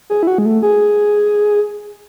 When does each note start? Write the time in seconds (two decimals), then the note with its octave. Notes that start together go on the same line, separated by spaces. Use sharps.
0.10 G#4
0.23 E4
0.27 F#4
0.38 G#3
0.46 A3
0.63 G#4